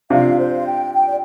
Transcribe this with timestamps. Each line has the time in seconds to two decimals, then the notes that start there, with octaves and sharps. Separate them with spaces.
0.10 C3 F3 D4 F4 F5
0.38 C5
0.55 F5
0.66 G5
0.93 G5
1.07 D5